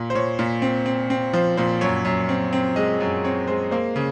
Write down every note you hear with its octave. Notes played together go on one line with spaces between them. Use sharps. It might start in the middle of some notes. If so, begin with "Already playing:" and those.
Already playing: A#2
C5
A#2 C#5
A#2
C4
C4
C4
F3 C5
A#2 C5
F#2 C#5
F#2
C4
C4
G#3 D#5
F#2
C4 C#5
G#3 C5
A#3 C5
C#3